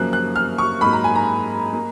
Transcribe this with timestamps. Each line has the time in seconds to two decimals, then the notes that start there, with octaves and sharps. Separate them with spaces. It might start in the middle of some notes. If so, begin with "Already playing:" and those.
Already playing: F#2 C#3 F3 A#3 F#6
0.13 F#6
0.36 F6
0.58 C#6
0.81 G#2 F#3 A#3 B5
0.93 A#5
1.04 G#5
1.15 A#5
1.73 A#3